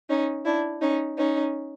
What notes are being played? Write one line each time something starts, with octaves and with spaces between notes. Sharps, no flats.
C#4 D#4
D4 E4
C#4 D#4
C#4 D#4